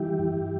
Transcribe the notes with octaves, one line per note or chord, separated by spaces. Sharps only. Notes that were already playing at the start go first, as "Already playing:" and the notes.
Already playing: E3 G3 E4 G4
G2